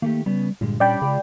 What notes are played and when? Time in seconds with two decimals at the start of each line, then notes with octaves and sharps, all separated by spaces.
0.02 D#3 A3 A#3 G4
0.26 C#3 G3 B3
0.61 G2 A#2 D3 G#3
0.80 G3 C#4 D4 D5 G5 B5
1.02 C#3 G#3 F4